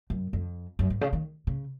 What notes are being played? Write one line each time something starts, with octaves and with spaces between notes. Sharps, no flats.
F#2
F2
F#2
G#2
C#3
D#3
C#3